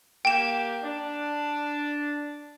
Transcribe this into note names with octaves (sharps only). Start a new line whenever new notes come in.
A#3 G4 G5 E7
D4